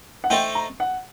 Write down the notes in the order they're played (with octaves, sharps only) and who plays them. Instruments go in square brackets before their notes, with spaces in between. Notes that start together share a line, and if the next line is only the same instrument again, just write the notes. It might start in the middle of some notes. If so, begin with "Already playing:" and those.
[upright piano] F#5
[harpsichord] A3 D#4 A4 C5 [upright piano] G5
[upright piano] A#5
F#5